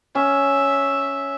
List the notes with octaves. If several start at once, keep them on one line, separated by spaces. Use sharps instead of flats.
C#4 E5